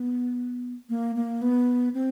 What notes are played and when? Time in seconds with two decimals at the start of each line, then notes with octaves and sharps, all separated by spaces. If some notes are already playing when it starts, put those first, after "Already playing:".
Already playing: B3
0.89 A#3
1.16 A#3
1.42 B3
1.94 C4